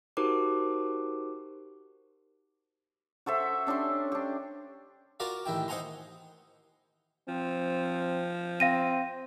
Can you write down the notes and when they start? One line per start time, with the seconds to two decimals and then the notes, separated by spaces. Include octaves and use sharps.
0.17 D#4 F#4 G4 A#4 C5 D6
3.26 F#4 A4 C5 E5
3.67 C#4 D4 G4 C6
4.12 D4 G4
5.20 F4 F#4 A#4 D5 F5
5.46 A1 D#3 E4 G5
5.68 D#4 C5 F#5 G#5 A#5 C6
7.28 F3 C4
8.60 C4 F5 A#6 D#7